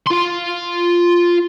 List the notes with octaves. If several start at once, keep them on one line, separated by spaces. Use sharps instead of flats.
F4 C6